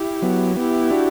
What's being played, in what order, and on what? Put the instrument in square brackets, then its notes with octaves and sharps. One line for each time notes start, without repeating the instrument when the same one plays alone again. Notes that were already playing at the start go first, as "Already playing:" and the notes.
Already playing: [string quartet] E4 G4
[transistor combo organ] F#3 B3
[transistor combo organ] B3 [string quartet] E4 G4
[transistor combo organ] D4 F#4